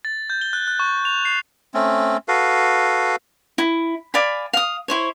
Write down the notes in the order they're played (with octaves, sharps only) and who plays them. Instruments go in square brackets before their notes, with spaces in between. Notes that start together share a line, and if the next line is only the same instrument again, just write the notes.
[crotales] A6
G6
G7
F#6
F#6
C#6
F7
C7
[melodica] A3 C4 C#4
F#4 A4 B4 F5
[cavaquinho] E4
D5 F5 G#5 B5
F5 D#6
E4 C5 C#5